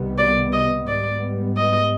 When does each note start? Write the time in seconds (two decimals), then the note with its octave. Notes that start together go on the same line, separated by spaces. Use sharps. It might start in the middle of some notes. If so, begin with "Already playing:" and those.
Already playing: C2 C3 D#3 G3 B3
0.18 D5
0.53 D#5
0.87 G#2 G3 B3 D5
1.57 D#5